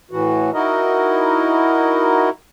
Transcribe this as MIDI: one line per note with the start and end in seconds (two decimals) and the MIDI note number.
0.11 0.51 45
0.11 0.51 52
0.11 0.51 66
0.54 2.30 63
0.54 2.30 64
0.54 2.30 66
0.54 2.30 70
0.54 2.30 75